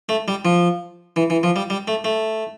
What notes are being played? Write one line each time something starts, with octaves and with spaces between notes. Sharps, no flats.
A3
G3
F3
E3
E3
F3
G3
G3
A3
A3